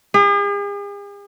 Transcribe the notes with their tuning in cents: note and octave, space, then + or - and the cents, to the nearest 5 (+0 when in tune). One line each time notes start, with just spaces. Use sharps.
G#4 -45